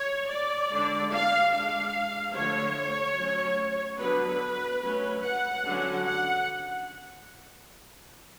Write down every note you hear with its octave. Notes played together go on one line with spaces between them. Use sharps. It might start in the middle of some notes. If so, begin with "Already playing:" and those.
Already playing: C#5
D5
D3 G#3 D4
F5
G#3 D4 F5
D3 F3 A3 C#5
F#3 A3 C#4
D3 F#3 B3 D4 B4
F#3 A3 C#4
F#5
D3 F#3 C#4
F#5